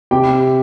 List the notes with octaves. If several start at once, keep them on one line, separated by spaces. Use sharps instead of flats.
C3 G4 G5